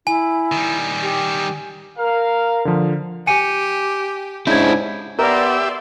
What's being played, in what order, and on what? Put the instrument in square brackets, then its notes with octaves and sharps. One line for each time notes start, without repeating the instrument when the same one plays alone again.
[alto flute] E4 [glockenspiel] G#5
[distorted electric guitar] D#3 G3
[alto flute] G4
[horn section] A#4 F5
[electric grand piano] D3 F3
[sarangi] G4 [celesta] G#5 C#7 D#7
[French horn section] G#2 C#3 [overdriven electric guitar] D4 E4 [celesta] G6 G#6
[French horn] B3 [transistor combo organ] G4 E5 [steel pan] A#4 [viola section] D5 C6